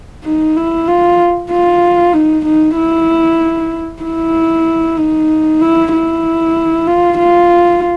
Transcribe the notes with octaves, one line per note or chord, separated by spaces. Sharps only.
D#4
E4
F4
F4
D#4
D#4
E4
E4
D#4
E4
E4
F4
F4